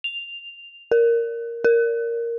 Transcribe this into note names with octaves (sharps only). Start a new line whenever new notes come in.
F7
A#4
A#4